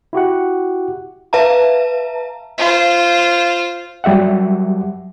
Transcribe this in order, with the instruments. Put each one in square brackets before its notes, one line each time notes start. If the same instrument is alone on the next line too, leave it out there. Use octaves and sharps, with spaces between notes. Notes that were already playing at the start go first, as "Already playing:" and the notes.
[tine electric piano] E4 F#4 G4 F#5
[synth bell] B4 E5 F5 A5 A#5
[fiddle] F4 C5
[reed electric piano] F#3 G3 G4 E5 F#5